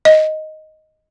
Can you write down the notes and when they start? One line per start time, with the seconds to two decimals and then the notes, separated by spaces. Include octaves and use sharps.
0.05 D#5